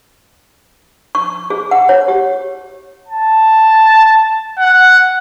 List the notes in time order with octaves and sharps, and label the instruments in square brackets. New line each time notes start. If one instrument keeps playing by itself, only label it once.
[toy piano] C#6
G#4
F#5
C#5
G4
[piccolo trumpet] A5
F#5